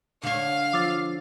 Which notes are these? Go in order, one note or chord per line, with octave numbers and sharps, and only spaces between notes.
D3 C#5 F5
F3 D6 E6 A6